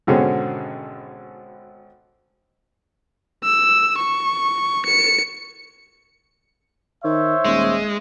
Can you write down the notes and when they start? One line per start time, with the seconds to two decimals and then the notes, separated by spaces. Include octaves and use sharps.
0.07 G#1 B2 D3 C4 C#4 G#4
3.44 E6
3.98 C#6
4.86 C#7
7.04 D#3 C5 C#5 E5
7.45 D#1 G#3